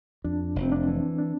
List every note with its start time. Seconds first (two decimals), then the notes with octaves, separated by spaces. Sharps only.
0.24 F2 D4
0.56 F1
0.62 C4
0.72 D4
0.88 E3
1.19 D4